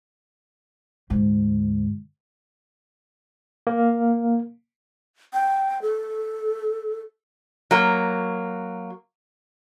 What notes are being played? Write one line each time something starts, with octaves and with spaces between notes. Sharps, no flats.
D2 G#2
A#3
G5
A4
F#3 A#3